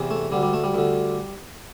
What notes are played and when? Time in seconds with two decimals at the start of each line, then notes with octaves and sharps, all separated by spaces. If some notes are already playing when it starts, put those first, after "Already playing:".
Already playing: E2 C3 E3
0.10 A3
0.32 D2 D3 G3
0.43 G3
0.53 A3
0.64 G3
0.74 D2 D3